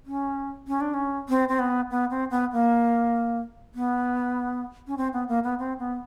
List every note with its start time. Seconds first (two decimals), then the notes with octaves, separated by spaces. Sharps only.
0.06 C#4
0.68 C#4
0.81 D4
0.94 C#4
1.29 C4
1.48 C4
1.59 B3
1.91 B3
2.10 C4
2.31 B3
2.52 A#3
3.75 B3
4.87 C#4
4.97 C4
5.13 B3
5.28 A#3
5.44 B3
5.59 C4
5.79 B3